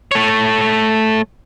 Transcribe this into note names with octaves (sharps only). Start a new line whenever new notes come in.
A3 C#5